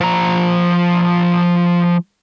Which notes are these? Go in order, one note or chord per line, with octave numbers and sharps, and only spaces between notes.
F3 A#5